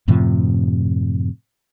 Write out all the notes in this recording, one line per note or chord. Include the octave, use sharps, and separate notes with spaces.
F#2 A2 C3 F3